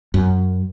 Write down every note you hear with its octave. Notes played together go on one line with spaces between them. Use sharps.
F#2